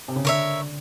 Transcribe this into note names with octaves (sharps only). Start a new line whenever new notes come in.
C3
C#3
D3 A#4 C#5 E5